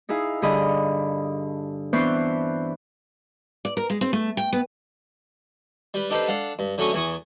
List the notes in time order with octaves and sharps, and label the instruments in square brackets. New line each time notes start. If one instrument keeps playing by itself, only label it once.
[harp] D#4 E4 G#4 F5
G2 D3 G#4 D#5 B5
E3 B3 C4 D4 C5 C#6
[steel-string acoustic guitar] D5
A#4
G#3
C4
A3
G5
B3
[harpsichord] G3 B4
D4 D#4 G4 A4 B4 C5
D4 A4 F5 F#5
G2
D3 F#3 A3 C#4 C#6 D#6
E2 E3 G#5 C#6 D#6